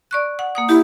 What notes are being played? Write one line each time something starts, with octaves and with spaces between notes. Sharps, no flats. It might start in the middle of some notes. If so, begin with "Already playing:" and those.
D5 C#6 F#6
F#5
A#3 F#5 D#6
E4 G4